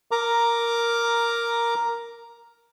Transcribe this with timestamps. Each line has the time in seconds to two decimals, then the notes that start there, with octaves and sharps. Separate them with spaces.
0.11 A#4 A#5 D6